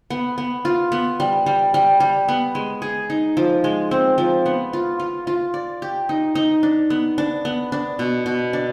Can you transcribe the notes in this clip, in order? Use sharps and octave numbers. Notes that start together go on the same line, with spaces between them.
B3
B3
F4
B3
G3
G3
G3
G3
B3
G#3
G#4
D#4
F3
G#3
C4
F3
B3
F4
F4
F4
D5
G4
D#4
D#4
D4
B3
D4
B3
D4
B2
B2
D4